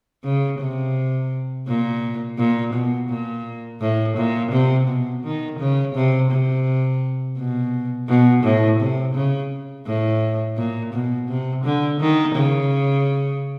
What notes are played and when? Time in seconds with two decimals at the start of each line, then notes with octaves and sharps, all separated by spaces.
0.24 C#3
0.60 C3
1.67 A#2
2.38 A#2
2.73 B2
3.09 A#2
3.81 A2
4.17 A#2
4.51 C3
4.87 B2
5.23 D#3
5.59 C#3
5.95 C3
6.31 C3
7.37 B2
8.08 B2
8.43 A2
8.80 C3
9.14 C#3
9.87 A2
10.57 A#2
10.94 B2
11.28 C3
11.64 D3
12.00 D#3
12.35 C#3